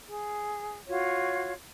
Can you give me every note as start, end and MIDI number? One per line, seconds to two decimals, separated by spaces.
0.07 0.78 68
0.88 1.53 65
0.88 1.53 66
0.88 1.53 73